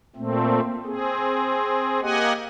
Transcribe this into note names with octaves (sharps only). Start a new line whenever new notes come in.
A#2 A3 C4
C4 G#4
A#3 G4 D#5 F#5 G#5